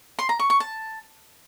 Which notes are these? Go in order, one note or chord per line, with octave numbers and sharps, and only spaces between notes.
C6
A#5
C#6
C#6
A5